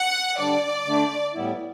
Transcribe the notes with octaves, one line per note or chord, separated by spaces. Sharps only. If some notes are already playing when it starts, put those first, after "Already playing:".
Already playing: F#5
D3 G3 D4 D5
D3 A3 D4
A2 G3 B3 E4